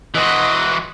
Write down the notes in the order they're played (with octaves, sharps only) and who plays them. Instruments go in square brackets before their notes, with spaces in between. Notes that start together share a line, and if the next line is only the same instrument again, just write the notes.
[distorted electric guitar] E3 F#4 [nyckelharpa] D#5 C6